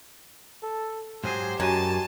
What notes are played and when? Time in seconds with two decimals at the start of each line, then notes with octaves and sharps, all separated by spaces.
0.62 A4
1.24 G#2 F#3 G4 G#4 C5
1.60 F#2 C#5 D#5 G#5 A5